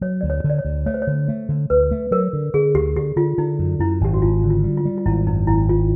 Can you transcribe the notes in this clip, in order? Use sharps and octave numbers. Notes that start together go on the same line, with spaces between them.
F#3 C#5
D2 D5
C#5
D3
D5
C#5
D2
A3 C#5
C5
C#5
D3
A3
D3
D2 B4
A3
F#3 A#4
D3
D3 G#4
D2 G4
D3 G4
D3 F4
D3 D#4
F#2
F#2 E4
G#1 G4
F#4
G#1 F4
D3
F4
G3
F4
G3
F4
G#1 E4
F#2 D#4
G#1 E4
G#1 F4